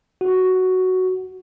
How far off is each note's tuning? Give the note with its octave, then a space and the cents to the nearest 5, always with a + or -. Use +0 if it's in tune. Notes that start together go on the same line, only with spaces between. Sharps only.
F#4 +5